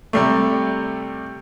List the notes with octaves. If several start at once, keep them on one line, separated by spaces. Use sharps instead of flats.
C3 G3 A3